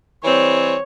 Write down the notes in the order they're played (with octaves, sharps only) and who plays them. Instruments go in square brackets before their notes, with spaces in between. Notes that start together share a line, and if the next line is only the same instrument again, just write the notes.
[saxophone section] E3 G3 C4 [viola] C#5